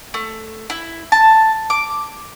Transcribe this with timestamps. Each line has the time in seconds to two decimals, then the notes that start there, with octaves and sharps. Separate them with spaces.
0.14 A3
0.70 E4
1.12 A5
1.70 D6